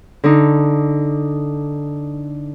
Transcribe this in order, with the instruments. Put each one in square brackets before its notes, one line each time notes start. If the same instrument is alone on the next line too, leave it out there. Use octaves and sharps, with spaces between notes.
[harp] D3 D#4